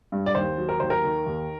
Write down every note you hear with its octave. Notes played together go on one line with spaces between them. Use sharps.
G2
D5
D#2 C5
F#3
A#4
D#2 C5
A#4
D#3
D#2